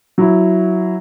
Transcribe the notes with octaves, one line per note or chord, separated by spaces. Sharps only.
F#3 E4